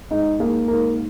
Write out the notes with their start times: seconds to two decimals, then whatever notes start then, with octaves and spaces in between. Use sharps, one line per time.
0.11 G#2 D#4 D#5
0.40 A#3 G#4
0.68 G#2 A#4